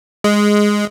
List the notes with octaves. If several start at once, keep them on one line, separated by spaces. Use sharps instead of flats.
G#3